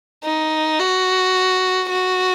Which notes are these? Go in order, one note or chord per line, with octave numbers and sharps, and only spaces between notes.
D#4
F#4
F#4